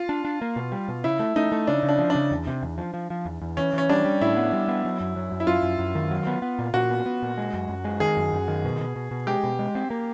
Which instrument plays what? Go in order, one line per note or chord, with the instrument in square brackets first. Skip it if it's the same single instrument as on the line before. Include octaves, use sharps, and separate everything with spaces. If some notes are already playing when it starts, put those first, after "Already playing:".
Already playing: [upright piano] F4
[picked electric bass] D4
D4
A#3
B2
G3
B2
[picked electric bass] C#3 [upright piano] E4
[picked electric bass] A3
[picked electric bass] A3 [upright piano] D#4
[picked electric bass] A3
[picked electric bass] C#3 [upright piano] D4
[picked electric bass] C#3
[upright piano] D4
[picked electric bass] F3
[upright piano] D4
[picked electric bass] C#3
E2
C3
E2
F3
F3
F3
E2
E2
[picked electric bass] E3 [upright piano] C#4
[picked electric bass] E3 [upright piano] C#4
[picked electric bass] G3 [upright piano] D4
[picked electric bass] G3
[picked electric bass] A2 [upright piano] E4
[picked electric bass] B3
G3
B3
F#3
F#2
F#3
F#2
[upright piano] E4
[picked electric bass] F#2 [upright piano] F4
[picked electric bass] F#2
F#2
D#3
F#3
B3
B3
A#2
[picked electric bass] A#2 [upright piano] F#4
[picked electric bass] B3
B3
A#2
G#3
F#2
F#2
G#3
[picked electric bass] D#3 [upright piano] G#4
[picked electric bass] F#2
F#2
D#3
B2
B2
B2
B2
[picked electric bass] G#3 [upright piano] G4
[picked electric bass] B2
G#3
C4
A#3